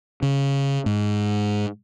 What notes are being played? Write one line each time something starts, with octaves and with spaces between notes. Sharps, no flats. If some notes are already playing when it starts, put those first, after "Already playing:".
C#3
G#2